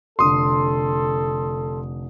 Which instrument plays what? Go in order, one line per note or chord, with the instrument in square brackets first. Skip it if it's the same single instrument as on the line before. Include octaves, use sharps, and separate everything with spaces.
[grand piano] F1 D3 [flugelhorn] A4 [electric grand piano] C6 D#6